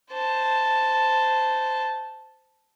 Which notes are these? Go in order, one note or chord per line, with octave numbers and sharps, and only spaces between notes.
C5 A5